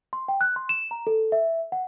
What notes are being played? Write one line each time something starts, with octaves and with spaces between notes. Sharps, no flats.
C6
G5
F#6
C6
E7
A#5
A4
E5
F#5